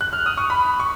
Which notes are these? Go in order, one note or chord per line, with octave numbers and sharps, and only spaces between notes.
F#6
F6
D#6
C#6
B5
C#6